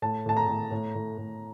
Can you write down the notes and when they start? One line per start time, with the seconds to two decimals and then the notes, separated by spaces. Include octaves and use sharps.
0.02 A2 A5
0.26 A2 A5
0.37 A#5
0.48 A2
0.71 A2
0.95 A2
1.18 A2